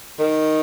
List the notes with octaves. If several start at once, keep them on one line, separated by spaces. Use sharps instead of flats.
D#3